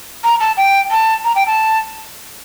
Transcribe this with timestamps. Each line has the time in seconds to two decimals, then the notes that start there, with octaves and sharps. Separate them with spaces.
0.24 A#5
0.40 A5
0.57 G5
0.91 A5
1.24 A#5
1.36 G5
1.47 A5